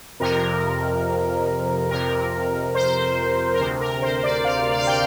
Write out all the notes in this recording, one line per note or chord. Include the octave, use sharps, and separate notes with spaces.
F2 C3 A#4
F2 C3 A#4
C5
A#4
D2 C3 C5
A#4
C5
C5
D5
F5
D5
F5
G5